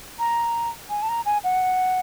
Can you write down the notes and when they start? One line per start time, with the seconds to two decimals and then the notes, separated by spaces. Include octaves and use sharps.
0.19 A#5
0.90 G#5
1.02 A5
1.09 A#5
1.26 G#5
1.44 F#5